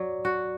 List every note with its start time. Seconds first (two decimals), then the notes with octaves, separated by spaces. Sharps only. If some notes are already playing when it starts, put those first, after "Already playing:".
Already playing: F#3 D5
0.25 F#4